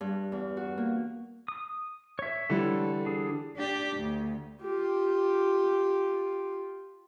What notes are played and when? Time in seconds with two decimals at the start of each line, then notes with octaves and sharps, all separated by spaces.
0.01 G2
0.32 E2
0.57 F#4
0.78 A#3
1.48 D#6
2.19 C#5 E5
2.50 D3 E3 G3 A4 C#5
3.06 D4 G#4
3.57 D4 G4
3.97 D2
4.62 F4 G4